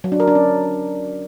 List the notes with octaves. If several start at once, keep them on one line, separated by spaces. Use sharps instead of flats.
F#3
D4
A#4
D4
C#4